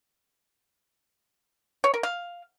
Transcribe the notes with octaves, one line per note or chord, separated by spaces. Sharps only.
C#5
A#4
F5